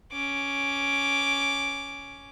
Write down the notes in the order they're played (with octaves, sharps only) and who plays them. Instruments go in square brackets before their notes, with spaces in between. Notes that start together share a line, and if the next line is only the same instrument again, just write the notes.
[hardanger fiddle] C#4 D6